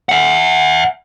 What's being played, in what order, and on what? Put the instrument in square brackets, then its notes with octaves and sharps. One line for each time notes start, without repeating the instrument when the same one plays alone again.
[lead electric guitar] E5 F#5